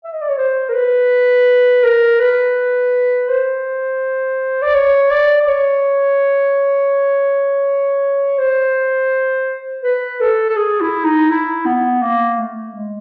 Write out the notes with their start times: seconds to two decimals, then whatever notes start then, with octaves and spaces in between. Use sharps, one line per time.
0.05 E5
0.13 D#5
0.21 D5
0.29 C#5
0.38 C5
0.69 A#4
0.74 B4
1.83 A#4
2.19 B4
3.29 C5
4.63 D5
4.75 C#5
5.11 D5
5.42 D5
5.47 C#5
8.39 C5
9.83 B4
10.21 A4
10.50 A4
10.57 G#4
10.81 E4
11.05 D#4
11.30 E4
11.66 B3
12.02 A#3
12.39 A3
12.75 G#3